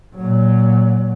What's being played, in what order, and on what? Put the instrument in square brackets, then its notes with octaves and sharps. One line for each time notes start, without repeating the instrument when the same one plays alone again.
[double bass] A#2 F#3